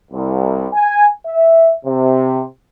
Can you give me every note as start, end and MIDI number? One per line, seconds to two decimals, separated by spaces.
0.11 0.66 36
0.73 1.07 80
1.25 1.72 76
1.85 2.43 48